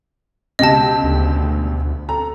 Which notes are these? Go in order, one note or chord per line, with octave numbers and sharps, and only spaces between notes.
C#2 B2 G4 D#5 A5
D2
A4 A#5